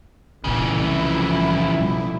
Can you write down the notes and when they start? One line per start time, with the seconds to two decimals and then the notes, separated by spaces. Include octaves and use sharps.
0.44 D#1 C2 A#2 C#3 E3
0.77 C2 F3 E4
1.80 B2 G3